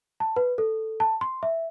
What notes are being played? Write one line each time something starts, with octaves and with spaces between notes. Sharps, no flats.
A5
B4
A4
A5
C6
E5